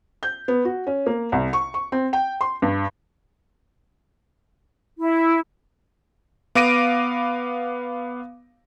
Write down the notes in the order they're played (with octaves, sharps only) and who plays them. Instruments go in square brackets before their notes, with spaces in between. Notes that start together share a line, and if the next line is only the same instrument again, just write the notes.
[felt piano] G6
B3
F#4
C#4
A#3
C2
C#6
C#6
C4
G5
C6
G2
[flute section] E4
[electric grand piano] B3 F5 D6 A#6 D7 D#7